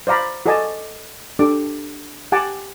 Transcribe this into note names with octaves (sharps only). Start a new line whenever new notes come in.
C5 D5 F5 A#5 B5
F#4 A4 D5 D#5 G#5 A5
D4 G4 A4 D6
G4 F#5 G#5 A5 D6